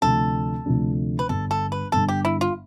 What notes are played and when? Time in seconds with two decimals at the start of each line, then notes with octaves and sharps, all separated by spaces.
0.02 D2 C3 F3 A3 D4 A4
0.66 D2 C3 F3 A3 D4
1.19 B4
1.29 G1 G2 D3 A4
1.51 A4
1.72 B4
1.92 G1 G2 D3 A4
2.09 G4
2.25 E4
2.41 F4